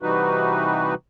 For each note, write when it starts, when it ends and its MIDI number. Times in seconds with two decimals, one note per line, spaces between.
0.03 0.94 48
0.03 0.94 52
0.03 0.94 55
0.03 0.94 63
0.03 0.94 66
0.03 0.94 71